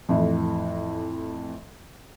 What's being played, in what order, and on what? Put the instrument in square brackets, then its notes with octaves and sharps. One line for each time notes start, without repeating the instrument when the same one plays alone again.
[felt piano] F2 A2 E3